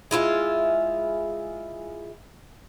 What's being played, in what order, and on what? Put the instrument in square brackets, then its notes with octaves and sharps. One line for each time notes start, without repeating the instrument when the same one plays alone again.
[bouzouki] G#3 E4 F4